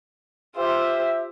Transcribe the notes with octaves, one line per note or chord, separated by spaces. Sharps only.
F4 G4 C5 E5